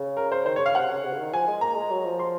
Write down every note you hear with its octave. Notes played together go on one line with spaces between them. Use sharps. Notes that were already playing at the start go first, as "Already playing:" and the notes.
Already playing: C#3
A#4
C5
D#3 C5
C#5
C#3
F5
C3 F#5
C#3
C3
C#3
D#3
F3 G#5
G#3
A#3 A#5
G#3
F#3
F3
C6